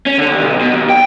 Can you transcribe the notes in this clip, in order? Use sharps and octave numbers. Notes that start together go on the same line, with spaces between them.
C#4
D3
D#2
B1
B2
D#2
G5